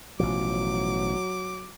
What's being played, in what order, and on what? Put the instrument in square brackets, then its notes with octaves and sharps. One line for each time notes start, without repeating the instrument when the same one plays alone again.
[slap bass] A1 B2 F3 [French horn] F#3 [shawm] D6